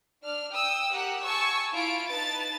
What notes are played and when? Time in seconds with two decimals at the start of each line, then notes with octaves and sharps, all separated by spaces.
0.22 D4 F6
0.51 G5 D#6 E6
0.92 G4 A#4 F#5
1.22 G#5 A5 C#6 E6
1.73 E4 F4 D7
2.08 D#4 B4 A5 A6